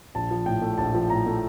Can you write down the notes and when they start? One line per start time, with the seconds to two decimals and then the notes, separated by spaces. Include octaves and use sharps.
0.15 A#1 A5
0.31 F3
0.46 A2 G5
0.62 A3
0.78 A#1 A5
0.95 F3
1.10 A2 A#5
1.26 A3